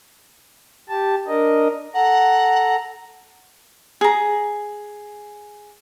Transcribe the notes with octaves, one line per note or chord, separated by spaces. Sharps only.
G4 A5
D4 A#4 D#5
A4 F#5 A#5
G#4 A#5